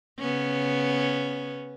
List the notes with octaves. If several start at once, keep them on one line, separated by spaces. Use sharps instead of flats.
C#3 B3 C#4